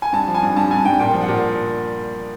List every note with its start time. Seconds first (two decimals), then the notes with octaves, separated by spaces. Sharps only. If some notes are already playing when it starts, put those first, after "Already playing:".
0.02 G#5
0.12 G2 A5
0.27 F3
0.35 G#5
0.43 G2
0.56 G2 A5
0.71 G2 G#5
0.85 G2 G5
0.99 A#2 G5
1.14 F3
1.21 F#5
1.28 A#2